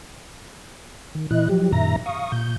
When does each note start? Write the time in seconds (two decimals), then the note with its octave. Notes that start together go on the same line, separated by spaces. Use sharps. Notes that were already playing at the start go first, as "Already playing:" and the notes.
1.15 D#3
1.31 A#2 E3 E4 D#5 F#6
1.49 F3 F#3 G4
1.72 F#2 A#2 D#3 E5 A#5 A#6
2.06 F5 C#6 D#6
2.32 A#2 G6